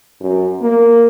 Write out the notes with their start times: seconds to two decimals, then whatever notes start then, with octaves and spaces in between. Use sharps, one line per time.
0.21 F#2
0.62 A#3